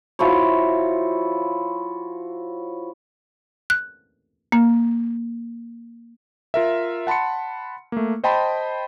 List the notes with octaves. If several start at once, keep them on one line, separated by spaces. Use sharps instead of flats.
F3 E4 F#4 C#5
F#6
A#3
F4 A#4 E5
F#5 A5 B5 C6 C#7
A3 A#3
C5 D#5 G5 A5 B5 C6